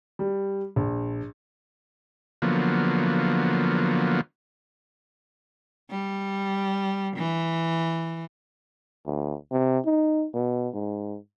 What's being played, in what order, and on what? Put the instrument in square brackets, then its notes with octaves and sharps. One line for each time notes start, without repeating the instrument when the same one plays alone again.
[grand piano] G3
A#1
[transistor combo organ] D3 F3 F#3 A#3 B3
[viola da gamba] G3
E3
[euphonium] D2
C3
D#4
B2
G#2